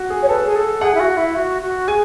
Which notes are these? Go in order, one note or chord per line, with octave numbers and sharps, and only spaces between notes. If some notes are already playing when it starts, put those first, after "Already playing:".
Already playing: F#4
G#4
C#5
A4 B4
G#4
A4
G#4 F#5
E4
F#4
E4
F#4
F#4
G#4 G#5